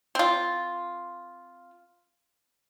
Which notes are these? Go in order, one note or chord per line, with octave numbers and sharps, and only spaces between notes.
C4 F4